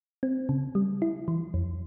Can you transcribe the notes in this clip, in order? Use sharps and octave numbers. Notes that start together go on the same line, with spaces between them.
C4
C#3
G3
E4
E3
F2